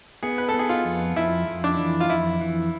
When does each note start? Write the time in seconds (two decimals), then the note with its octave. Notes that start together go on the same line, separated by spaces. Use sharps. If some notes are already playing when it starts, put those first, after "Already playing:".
0.23 B3 G#4
0.38 B4
0.49 A4
0.54 B3
0.59 G#4
0.69 F4
0.85 F2
1.16 F2 E4
1.48 F2
1.64 D4
1.79 E3
2.00 F4
2.10 F2 E4
2.41 E3